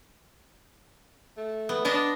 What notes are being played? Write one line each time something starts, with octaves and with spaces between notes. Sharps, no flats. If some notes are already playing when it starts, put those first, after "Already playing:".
A3
B3
B3 D4 D#5 A#5